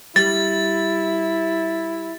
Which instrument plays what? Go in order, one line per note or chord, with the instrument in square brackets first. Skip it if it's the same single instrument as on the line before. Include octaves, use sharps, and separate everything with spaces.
[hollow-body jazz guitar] G3 [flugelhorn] E4 [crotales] A6